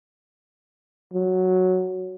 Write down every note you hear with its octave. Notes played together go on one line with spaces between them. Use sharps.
F#3